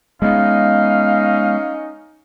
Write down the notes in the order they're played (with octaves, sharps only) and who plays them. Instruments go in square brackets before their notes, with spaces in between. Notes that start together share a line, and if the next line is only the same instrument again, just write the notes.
[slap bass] G#3 B3 [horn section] C#4 D#4 [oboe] F5